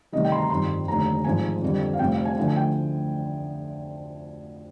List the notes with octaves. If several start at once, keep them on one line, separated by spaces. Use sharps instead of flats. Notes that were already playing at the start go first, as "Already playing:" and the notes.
D2 C3 D#3 G3 D#5
G5
C6
A#5
G1 F2 D#3 G3 C6
F1 D#2 D3 A#5
G#1 G#2 F3 G#5
F2 D3 G3
F5
F1 F2 C3 G3 G5
F5
G#5
D2 D3 F3 G#5
G#5
G5